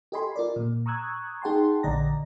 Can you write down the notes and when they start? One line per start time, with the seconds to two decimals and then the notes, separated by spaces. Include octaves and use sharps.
0.12 G4 A4 D#5 G#5 B5 C6
0.36 F4 A#4 D5
0.56 A#2
0.86 A#5 C#6 D#6 E6 F#6 G#6
1.42 D#4 G#4 F#5 G5 A5 C6
1.83 A#1 D3 D5 D#5 A#5 A#6